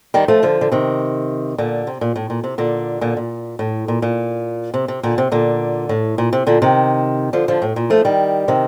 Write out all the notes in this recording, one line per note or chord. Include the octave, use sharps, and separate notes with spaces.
D#3 G3
F3 A3
D3 F3
D3
C3 D#3
A#2 D3
C3
A#2
A2
A#2
C3
A#2 D3
A#2 D3
A#2
A2
A#2
A#2
C3
C3
A#2 D3
C3
A#2 D3
A2
A#2
C3
A#2 D3
C3 D#3
D3 F3
D3 F3
A2
A#2
F3 A3
D#3 G3
C3 D#3